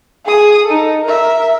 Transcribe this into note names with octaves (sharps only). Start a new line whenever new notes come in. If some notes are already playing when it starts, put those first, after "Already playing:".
G#4 D#6
D#4 A4
A#4 E5